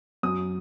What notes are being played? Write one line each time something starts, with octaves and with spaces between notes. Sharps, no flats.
F#2 D#6